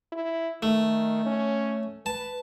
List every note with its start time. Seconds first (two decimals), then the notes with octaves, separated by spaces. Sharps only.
0.12 E4
0.62 D#3 A3
1.25 C#4
2.06 B4 A5